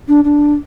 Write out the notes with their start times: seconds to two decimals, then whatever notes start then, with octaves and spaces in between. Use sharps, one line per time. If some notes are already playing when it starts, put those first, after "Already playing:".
0.08 D4
0.24 D4